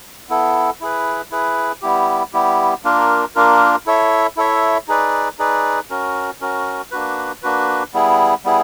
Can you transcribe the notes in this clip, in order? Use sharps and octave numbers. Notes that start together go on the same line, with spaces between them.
B3 E4 A4
E4 G#4 B4
E4 G#4 B4
G3 B3 E4 G4
G3 B3 E4 G4
A#3 D4 F4 A#4
A#3 D4 F4 A#4
E4 A4 C#5 E5
E4 A4 C#5 E5
D#4 G#4 B4 D5
D#4 G#4 B4 D5
C#4 F#4 A#4
C#4 F#4 A#4
A#3 D4 F#4 B4
A#3 D4 F#4 B4
G3 B3 E4 G#4
G3 B3 E4 G#4